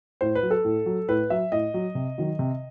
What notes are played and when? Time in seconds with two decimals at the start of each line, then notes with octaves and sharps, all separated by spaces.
0.21 A2 C5
0.35 B4
0.43 F#3
0.51 A4
0.64 A2
0.86 F#3
1.08 A2 B4
1.30 F#3 E5
1.52 A2 D#5
1.74 F#3
1.95 C3
2.18 D#3 F#3
2.39 C3